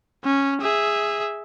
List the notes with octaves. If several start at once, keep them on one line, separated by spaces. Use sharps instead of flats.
C#4
G#4 E5